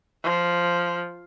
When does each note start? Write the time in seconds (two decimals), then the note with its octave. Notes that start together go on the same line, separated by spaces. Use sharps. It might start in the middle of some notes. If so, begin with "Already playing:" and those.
0.24 F3